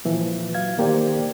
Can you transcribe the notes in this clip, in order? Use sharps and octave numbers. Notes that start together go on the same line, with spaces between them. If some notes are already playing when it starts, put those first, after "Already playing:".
A#2 E3 F3
F#3 F5 G#6
E2 D#3 A#3 G4 C5 D5